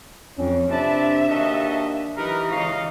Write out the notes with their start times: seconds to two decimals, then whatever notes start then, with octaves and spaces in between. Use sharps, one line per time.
0.38 F2 C4 C#4
0.71 C3 D4 B4 D5 E5 A5
1.29 D#2 F#4 A4 D#5
2.17 E3 D#4 G4 A#4 B4
2.51 C#2 D#5 F5 C#6